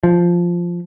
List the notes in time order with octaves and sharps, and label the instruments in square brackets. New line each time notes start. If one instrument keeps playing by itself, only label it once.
[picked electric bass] F3